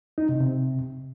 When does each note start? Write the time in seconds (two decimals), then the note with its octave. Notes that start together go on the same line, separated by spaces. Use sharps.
0.18 D#4
0.29 C3
0.40 C3